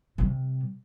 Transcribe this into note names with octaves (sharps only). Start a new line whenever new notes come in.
C3 G3